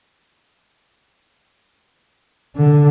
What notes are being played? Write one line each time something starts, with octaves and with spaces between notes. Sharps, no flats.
D3